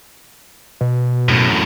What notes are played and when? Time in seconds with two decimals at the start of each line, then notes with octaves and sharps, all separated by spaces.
0.81 B2
1.29 F#2 A2